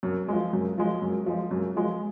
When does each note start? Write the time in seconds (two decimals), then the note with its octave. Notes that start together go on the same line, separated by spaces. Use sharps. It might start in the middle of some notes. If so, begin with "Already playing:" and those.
0.03 F#2
0.28 F3 G#3
0.53 F#2
0.78 F3 G#3
1.02 F#2
1.26 F3 G#3
1.51 F#2
1.76 F3 G#3